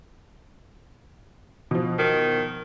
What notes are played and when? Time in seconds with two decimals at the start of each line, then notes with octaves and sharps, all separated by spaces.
1.71 B2 F3
1.99 D#3